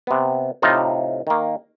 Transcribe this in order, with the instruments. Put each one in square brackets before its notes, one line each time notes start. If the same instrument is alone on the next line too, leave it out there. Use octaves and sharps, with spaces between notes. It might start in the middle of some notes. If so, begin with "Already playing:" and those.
[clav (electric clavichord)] C3 B3
A2 C3 D#4 F4
D#3 A#3